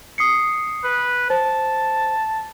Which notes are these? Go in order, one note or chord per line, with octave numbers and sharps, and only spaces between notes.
D#6 C7 C#7
B4
C5 A5